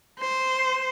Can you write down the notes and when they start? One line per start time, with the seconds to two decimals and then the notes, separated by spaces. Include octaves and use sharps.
0.19 C5